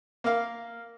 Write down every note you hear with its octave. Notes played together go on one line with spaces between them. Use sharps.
A#3 F5